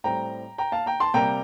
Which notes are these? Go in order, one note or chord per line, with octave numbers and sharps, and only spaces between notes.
A2 G3 C4 G5 A#5
G5 A#5
F5 A5
G5 A#5
A5 C6
C3 G3 A#3 G5 A#5